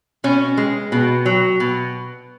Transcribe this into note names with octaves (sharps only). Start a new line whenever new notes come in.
B2 C#4
G#3
B2
F#3
B2